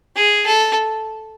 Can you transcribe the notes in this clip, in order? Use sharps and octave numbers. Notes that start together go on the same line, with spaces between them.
G#4
A4